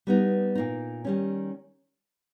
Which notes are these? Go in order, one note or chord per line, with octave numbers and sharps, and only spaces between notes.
G3 B3 D#4
A#2 A#3 D#4
D#3 G3 C#4